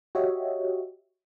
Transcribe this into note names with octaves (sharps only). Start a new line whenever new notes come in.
F#4 G4 C#5 D#5 E5